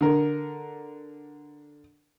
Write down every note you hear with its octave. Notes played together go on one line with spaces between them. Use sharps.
D3 A#4